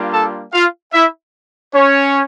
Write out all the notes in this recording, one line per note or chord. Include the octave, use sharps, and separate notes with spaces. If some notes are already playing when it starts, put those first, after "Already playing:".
Already playing: G3 A#3 D4 F4
A4 A5
F4 F5
E4 E5
C#4 C#5